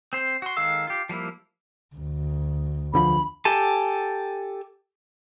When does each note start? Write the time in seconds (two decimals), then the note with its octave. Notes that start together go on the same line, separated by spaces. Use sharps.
0.13 C4 C5
0.42 F#4 C6
0.57 D#3 G#3 A4 F5 E6
0.87 F4 G4
1.09 F3 G3 A#3 E4
1.96 D2
2.94 E2 D3 F3 B5
3.45 G4 A4 G#5 A5